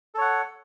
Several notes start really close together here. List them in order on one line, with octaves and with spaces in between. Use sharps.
A4 C#5 F#5